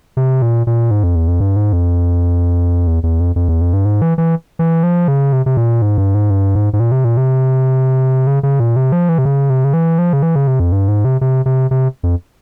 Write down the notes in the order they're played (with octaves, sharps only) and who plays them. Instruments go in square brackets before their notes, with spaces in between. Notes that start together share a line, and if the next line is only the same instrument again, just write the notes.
[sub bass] C3
A#2
A#2
G#2
F2
E2
F2
G2
G#2
F2
E2
E2
F2
F2
E2
F2
G2
G#2
E3
E3
E3
F3
C#3
C3
C3
A#2
G#2
G2
G#2
G2
G#2
G#2
A#2
C3
A#2
C3
C#3
C#3
A#2
C3
F3
E3
C3
C#3
C3
C#3
E3
F3
C#3
E3
C#3
C3
F2
G2
G#2
C3
C3
C3
C3
F2